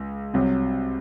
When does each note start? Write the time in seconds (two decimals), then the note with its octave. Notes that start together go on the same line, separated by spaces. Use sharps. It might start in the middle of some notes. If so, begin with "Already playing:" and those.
Already playing: C#2
0.33 C2 C3 F#3 C4